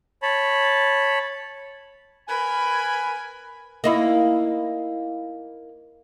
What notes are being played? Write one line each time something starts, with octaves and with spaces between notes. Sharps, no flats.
C#5 A5 B5
A#4 B4 G#5 B5
A#3 D#4 E4